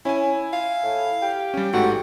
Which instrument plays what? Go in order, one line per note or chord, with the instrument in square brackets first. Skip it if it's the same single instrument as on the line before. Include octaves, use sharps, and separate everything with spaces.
[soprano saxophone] C#4 [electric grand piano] E4 G#5
[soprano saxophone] F5
[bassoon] A2
G4
[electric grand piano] G3 C#4
[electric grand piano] A1 G#2 A3 [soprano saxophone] F#4